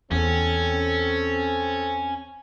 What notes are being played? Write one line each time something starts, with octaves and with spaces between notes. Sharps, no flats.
E2 C4 C#4 A4